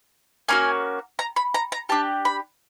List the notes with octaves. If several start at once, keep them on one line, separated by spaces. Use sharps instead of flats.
A#3 C#4 F#4 G#5
A#5
B5
A#5
A#5
D4 G4 A5
B5